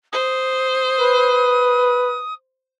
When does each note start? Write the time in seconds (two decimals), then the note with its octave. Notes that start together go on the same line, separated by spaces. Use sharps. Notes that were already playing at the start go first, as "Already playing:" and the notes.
0.12 C5 D#6
0.99 B4